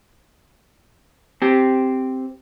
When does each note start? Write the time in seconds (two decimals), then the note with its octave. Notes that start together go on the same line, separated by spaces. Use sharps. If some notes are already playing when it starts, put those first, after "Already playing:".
1.42 C4 G4